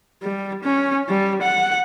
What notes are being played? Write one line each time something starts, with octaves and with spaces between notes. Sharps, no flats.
G3
C#4
G3
F#5